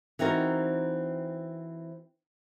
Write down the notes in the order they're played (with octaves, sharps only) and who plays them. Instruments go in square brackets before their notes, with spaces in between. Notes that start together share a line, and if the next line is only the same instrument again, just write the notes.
[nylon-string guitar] E3 C4 D#4 F#4 A#4